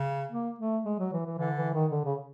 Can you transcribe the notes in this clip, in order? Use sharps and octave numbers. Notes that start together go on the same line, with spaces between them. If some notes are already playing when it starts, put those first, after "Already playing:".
Already playing: C#3
A#3
A3
G#3
F#3
E3
E3
D3 E3
E3
D#3
D3
C#3